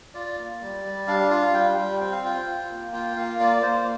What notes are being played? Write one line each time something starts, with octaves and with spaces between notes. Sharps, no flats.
F4 D5
A#3
G3
G3
D4 F5
F4 F5
G3 G5
G3 G5
C4 G5
F5
F4 G5
F4
A#3
F4 G5
A#3 F5
A#3 D5
A#3 C5